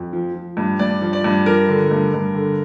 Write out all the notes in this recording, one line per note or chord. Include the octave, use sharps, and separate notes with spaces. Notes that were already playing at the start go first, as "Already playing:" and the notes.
Already playing: F2
F3
F3
G2
G2 D5
F3
D5
G2
F3 A#4
D3
G2
G2
D3